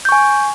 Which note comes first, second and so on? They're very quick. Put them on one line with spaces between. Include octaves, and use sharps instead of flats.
G6 C#6 G#5